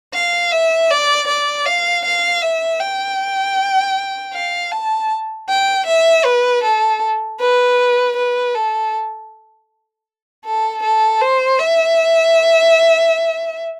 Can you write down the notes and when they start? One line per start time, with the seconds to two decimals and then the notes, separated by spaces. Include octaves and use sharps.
0.14 F5
0.52 E5
0.90 D5
1.28 D5
1.66 F5
2.05 F5
2.42 E5
2.81 G5
4.34 F5
4.72 A5
5.49 G5
5.86 E5
6.25 B4
6.64 A4
7.40 B4
8.17 B4
8.55 A4
10.45 A4
10.83 A4
11.22 C5
11.59 E5